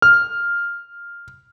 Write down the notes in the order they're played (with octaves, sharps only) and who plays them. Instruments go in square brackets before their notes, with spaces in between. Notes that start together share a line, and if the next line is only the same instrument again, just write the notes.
[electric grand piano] F6